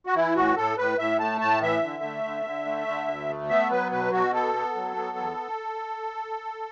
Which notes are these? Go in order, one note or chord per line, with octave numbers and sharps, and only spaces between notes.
F#4
E3 E4
A2 F#4
A2 A4
A2 B4
A2 E5
A3 A5
A2 A5
E3 E5
D3
A3
D3
D3
A3
D3
D2
A3
B3 E5
F#3 B4
B2 B4
B2 F#4
B3 A4
B3
F#3
B3
E2